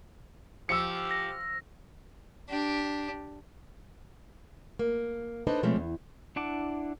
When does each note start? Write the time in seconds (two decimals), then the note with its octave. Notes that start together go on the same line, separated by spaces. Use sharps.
0.69 F3 G4 E6 C#7
1.11 A#6
2.49 D4 G4
4.79 A#3
5.47 D4 D#4 A4 B4 C5 D#5
5.63 B2 F3 G#3 A3 C4 C#4
5.76 E2
6.36 D4 E4 F#5 A5 D6